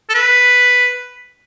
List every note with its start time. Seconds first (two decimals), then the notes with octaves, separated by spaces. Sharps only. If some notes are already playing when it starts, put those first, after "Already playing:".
0.09 A4
0.14 B4